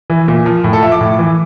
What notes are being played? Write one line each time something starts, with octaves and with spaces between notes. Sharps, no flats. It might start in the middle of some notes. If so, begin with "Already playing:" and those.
E3
A#2
F3
A2
A4
F3 E5
D6
A2
E3